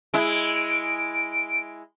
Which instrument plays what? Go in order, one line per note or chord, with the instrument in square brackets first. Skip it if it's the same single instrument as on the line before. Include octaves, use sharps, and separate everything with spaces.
[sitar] G#3 E4 [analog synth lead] D7